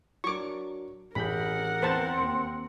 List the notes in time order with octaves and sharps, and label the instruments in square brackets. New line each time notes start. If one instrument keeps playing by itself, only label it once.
[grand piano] F#3 D4 A#4 [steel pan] C#6 D6
[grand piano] A1 G#4 G6 [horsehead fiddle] A#4 F#5 [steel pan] B5
[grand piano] E2 [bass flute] C4 [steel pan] B4 C5 A5
[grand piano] D#2 C#7